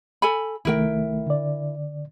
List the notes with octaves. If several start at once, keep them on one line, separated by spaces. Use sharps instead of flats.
A4 G#5 B5
C2 D#3 A3 E4 A#4 G5
D3 D5